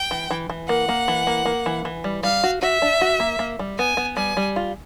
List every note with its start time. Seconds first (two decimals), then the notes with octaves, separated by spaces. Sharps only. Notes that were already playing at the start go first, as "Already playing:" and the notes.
Already playing: G5
0.11 E3
0.31 E3
0.50 E3
0.68 A#3 F#5
0.89 A#3
1.08 E3
1.27 A#3
1.45 A#3
1.66 E3
1.85 E3
2.04 G3
2.23 G3 F5
2.43 F#4
2.62 F#4 E5
2.82 D4
3.01 F#4
3.20 A#3
3.39 A#3
3.59 G3
3.78 B3 G#5
3.97 B3
4.17 G3 G#5
4.37 G3
4.56 F4